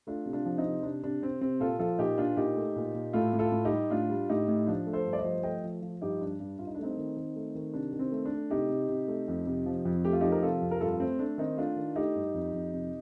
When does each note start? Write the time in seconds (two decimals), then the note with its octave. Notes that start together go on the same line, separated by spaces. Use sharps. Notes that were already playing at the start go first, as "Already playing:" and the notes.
0.07 A3 D4 F4
0.26 C3
0.33 D4 F4
0.45 F3
0.58 C4 D#4
0.64 C3
0.83 C3 D4
1.04 C3 D4
1.22 C3 C4
1.41 C3 C4
1.60 A#2 F4 A4
1.79 F3 F4 A4
1.99 A#2 D#4 G4
2.18 A#2 D4 F4
2.37 A#2 D#4 G4
2.56 A3
2.76 A#2
2.94 A#2
3.13 A2 F4 A4
3.33 A2
3.39 F4 A4
3.52 A2
3.65 D#4 G4
3.71 G3
3.90 A2 D4 F4
4.09 G3
4.29 A2 D#4 G4
4.48 A2
4.67 F3 D4
4.87 A3
4.93 A4 C5
5.05 G2
5.13 D5
5.19 C5 D#5
5.24 F3
5.43 A3 D#5 G5
5.64 F3
5.82 F3
6.02 G2 D#4 G4
6.21 G2 D4
6.40 G2
6.58 G2 F4
6.67 D#4
6.75 D4
6.79 A3 C4 D#4
6.97 D#3
7.17 D#3
7.36 A3
7.55 D#3
7.74 C3 D4
7.93 D#3
7.99 C4
8.12 A3
8.26 D4
8.32 A3
8.50 C3 D#4 G4
8.69 C3
8.89 C3
9.08 A3
9.28 F2
9.47 C3
9.66 F3
9.85 F2
10.05 A3 G4
10.13 F4
10.21 F3 D#4 G4
10.32 A#4
10.43 C3 F4 A4
10.61 F2
10.71 A#4
10.81 G2 F4 A4
11.00 A3 C4
11.19 A3 D4
11.38 D#3 C4 D#4
11.57 A3 D4 F4
11.76 D#3
11.96 A3 D#4 G4
12.15 G2
12.34 F2
12.53 F2
12.73 C3